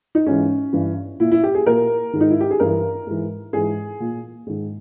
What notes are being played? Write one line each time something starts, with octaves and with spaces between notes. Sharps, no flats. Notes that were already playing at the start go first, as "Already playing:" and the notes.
D#4
G#2 E3 C#4
G2 E3
A#2 E4
E4
G4
G#4
A#2 A#4
G#2 D#3
D#4
E4
G4
G#4
G2 E3 A#4
G#2 E3
G#2 E3 G#4
A#2
G#2 D#3